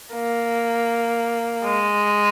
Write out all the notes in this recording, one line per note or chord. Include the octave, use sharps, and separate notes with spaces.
A#3
G#3